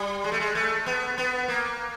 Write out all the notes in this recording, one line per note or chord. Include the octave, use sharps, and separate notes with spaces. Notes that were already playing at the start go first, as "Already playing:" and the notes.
Already playing: G3
G#3
A3
G#3
A3
B3
B3
A#3